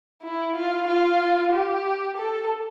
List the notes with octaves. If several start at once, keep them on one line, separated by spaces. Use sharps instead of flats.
E4
F4
F4
G4
A4